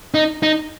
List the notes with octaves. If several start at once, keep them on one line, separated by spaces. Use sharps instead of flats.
D#4
D#4